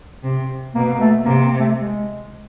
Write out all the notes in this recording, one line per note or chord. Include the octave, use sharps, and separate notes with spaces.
C3
B2 A#3
A#3
A3
C3 A#3
A#3
A3
G#3